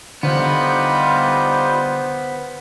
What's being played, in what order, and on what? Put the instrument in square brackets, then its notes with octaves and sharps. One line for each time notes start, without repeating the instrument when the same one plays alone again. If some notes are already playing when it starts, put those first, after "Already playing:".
[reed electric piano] D3 [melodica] G3 D#4 F4 [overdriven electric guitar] B3 [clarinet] C5